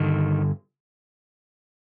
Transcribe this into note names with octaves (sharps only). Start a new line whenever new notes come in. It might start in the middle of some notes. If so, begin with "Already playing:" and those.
Already playing: G2 D3 D#3